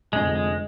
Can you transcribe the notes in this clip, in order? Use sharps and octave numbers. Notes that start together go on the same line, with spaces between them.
F1 F2 D3 G#3
G#3